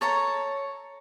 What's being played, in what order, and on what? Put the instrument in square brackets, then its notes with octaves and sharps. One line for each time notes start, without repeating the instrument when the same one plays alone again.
[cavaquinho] A4 C#5 A5 A#5